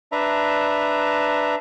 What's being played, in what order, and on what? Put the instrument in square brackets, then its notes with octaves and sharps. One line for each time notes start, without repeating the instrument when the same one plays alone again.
[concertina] D4 B4 E5 A#5